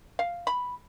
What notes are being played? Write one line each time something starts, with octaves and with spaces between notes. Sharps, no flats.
F5
B5